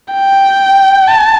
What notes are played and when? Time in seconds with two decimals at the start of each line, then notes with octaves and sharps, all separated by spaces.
0.13 G5
1.07 A5